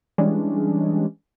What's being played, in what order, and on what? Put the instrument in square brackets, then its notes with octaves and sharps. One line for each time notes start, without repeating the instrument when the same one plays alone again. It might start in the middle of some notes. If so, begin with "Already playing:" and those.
[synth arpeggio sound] E3 G3 G#3 C#4 D4